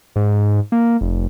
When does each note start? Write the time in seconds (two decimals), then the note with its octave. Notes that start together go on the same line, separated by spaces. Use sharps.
0.16 G#2
0.72 A#3
1.01 F1